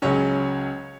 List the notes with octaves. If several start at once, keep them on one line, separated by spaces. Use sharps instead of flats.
C#2 C#3 F#3 C#4 C#5